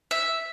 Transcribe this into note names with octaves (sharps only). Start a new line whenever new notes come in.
E5